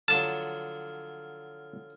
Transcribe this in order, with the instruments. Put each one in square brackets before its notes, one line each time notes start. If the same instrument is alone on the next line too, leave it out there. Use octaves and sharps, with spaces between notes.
[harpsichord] D3 F3 F#3 [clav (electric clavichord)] A5 [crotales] F6